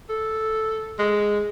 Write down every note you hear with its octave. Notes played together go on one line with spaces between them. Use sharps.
A4
G#3